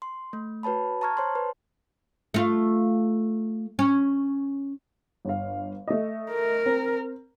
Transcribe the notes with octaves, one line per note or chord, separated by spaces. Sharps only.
C6
A3
F#4 B4 C#5 A5 B5
A5 A#5 C#6 F6 G#6
C5 C#5 A5 C6
B4
A3 F4
C#4
G1 F5
A3 D#5
A#4
C4